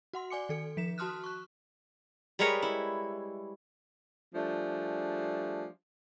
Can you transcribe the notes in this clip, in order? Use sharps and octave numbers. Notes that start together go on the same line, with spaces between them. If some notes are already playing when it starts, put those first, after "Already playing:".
F#4 F#5 C6
D5 G#5 D6 C#7
D#3 A4 C#7
F3 B6 E7
F#4 A5 C6 D#6 F6 F#6
C#6 F#6
G3 G#3 A#4 B4 C#5 D#5
E4
F3 G3 A3 D4 G#4